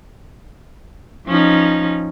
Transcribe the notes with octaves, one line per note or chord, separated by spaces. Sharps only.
F3 C#4 D#4